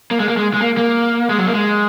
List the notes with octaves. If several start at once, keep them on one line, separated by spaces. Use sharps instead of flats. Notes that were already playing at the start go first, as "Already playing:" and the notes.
A#3
G#3
A#3
G#3
G#3
A#3
A#3
G#3
F#3
A#3
G#3